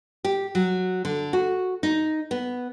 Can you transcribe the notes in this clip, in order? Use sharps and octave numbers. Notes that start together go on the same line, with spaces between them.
G4
F#3
D3
F#4
D#4
B3